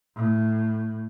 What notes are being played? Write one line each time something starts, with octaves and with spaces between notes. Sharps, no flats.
A2